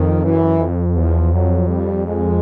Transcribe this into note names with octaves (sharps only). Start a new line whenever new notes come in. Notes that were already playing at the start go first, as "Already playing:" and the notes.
Already playing: F2 D#3
F#2 E3
F2
E2 F3
F2 F#3
G3
G#3